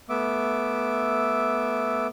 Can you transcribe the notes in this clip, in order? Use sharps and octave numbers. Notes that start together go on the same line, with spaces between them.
A3 B3 E5 D6